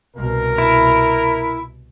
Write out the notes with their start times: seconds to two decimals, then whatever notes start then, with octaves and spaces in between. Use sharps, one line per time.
0.16 C2 B2 A#4
0.58 E4